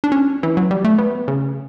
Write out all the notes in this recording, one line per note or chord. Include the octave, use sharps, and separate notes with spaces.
D4
C#4
E3
F#3
G3
A3
B3
C#3